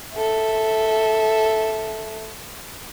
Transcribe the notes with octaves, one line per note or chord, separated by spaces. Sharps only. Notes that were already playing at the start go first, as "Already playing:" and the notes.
A4 E5